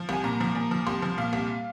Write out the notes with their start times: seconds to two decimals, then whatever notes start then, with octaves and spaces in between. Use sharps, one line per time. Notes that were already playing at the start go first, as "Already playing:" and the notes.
Already playing: F3
0.09 C2 G#5
0.24 A#2 A#5
0.41 F3
0.55 A#2
0.71 F3
0.86 C2 C6
1.02 F3
1.18 A#2 F5
1.33 C2